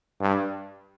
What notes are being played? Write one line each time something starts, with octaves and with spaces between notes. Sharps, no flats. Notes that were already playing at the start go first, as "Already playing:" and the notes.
G2